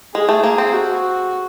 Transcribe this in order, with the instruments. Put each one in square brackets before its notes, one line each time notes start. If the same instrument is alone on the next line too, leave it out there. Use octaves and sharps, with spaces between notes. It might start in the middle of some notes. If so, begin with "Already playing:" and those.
[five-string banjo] G#3 [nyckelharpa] G#4
[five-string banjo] A3
A#3
C4
[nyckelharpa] F#4